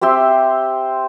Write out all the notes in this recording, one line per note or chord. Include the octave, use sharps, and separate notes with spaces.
C4 G4 E5 C6